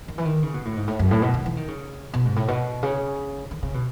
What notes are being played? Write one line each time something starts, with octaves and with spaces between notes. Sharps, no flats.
D#3
E3
D#3
C#3
B2
A2
G#2
A2
F#2
A2
B2
D#3
E3
D#3
C#3
B2
G#2
A2
B2
C#3
D#3
C#3
B2